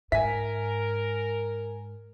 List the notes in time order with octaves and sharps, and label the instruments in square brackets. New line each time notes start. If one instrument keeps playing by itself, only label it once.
[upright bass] G#2 [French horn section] A#4 [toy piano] E5 [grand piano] G#5 B6